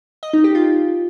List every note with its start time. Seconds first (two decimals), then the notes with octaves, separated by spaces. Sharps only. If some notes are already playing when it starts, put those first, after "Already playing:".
0.23 D#5
0.33 D#4
0.44 G4
0.55 F4